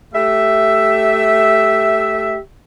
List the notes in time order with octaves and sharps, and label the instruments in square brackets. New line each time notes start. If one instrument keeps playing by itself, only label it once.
[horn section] A3 G4 E5